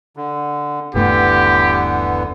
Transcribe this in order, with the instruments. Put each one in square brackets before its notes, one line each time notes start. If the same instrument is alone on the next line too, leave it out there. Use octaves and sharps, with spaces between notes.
[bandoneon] D3
[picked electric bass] D#1 G2 A3 [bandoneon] D3 E3 B3 [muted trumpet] G4